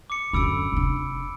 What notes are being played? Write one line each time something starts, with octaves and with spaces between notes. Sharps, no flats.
D6 C#7
F#2 D3 B5 E6 D7
F1 D4